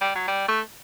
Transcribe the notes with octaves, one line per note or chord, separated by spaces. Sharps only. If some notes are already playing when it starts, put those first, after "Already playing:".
G3
F#3
G3
A3